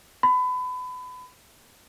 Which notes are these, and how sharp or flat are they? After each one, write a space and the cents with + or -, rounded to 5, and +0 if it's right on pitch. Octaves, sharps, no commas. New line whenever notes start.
B5 +30